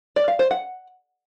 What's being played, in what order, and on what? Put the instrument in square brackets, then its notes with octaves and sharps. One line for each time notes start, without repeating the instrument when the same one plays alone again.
[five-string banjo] D5
F5
C5
F#5